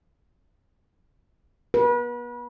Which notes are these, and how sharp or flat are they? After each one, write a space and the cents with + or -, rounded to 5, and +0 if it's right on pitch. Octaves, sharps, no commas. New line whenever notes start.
B4 -35